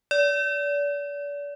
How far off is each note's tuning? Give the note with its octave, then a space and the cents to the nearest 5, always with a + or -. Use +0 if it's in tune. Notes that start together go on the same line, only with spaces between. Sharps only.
D5 -35